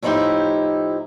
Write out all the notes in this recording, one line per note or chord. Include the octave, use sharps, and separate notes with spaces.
A2 F3 D#4 E4 G4